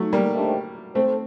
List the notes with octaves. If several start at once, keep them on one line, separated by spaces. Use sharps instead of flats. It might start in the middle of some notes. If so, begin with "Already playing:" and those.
Already playing: F#3 A3
G3 A#3
D#3 A3 D4 G4 C5
A3 C4 A4 C5